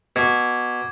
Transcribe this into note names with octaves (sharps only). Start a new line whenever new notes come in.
B2 D6 G#6